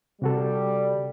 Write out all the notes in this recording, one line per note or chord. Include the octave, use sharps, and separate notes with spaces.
C3 G3 F#4 A4